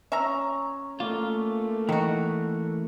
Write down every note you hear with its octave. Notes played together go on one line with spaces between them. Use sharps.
C#4 E5 A#5
A3 A#3 F4 F5
D#3 E3 F#4